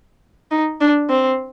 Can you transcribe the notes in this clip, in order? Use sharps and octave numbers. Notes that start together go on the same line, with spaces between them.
D#4
D4
C4